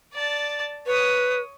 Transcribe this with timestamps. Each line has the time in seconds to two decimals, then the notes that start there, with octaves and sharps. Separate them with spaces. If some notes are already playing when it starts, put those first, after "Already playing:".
0.13 D5 A5
0.86 B4 C#5 D#6